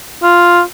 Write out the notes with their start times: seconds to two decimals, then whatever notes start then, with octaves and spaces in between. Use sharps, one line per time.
0.23 F4